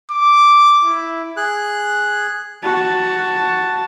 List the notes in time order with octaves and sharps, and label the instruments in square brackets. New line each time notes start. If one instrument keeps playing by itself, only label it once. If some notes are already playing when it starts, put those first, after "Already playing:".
[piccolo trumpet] D6
E4
[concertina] G#4 F#6
[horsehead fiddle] F#4 A5